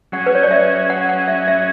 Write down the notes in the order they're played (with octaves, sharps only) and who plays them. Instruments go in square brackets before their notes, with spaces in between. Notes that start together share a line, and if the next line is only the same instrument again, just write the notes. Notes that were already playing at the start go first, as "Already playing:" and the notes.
[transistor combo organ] F#3 C#4 G#4 [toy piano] F#5
[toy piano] B4
C#5
D5
E5
F#5
F#5
E5
E5